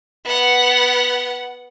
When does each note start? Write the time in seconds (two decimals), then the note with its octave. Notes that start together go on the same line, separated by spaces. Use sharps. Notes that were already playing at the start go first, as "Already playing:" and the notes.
0.25 B3 F#5